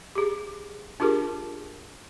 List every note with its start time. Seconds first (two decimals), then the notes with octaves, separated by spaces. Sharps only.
0.15 G4 G#4
1.00 D4 F4 G4 G#4 A#4